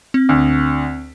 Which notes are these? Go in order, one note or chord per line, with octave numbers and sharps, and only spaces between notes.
C4
D2